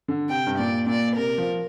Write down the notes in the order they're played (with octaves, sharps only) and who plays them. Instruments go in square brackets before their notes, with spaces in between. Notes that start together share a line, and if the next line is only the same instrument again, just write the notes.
[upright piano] D3
[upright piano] C3 [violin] G5
[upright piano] G2
[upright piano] A#2 [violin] D5
[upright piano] A#2 [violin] D5
[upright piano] C3 [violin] A#4
[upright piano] F3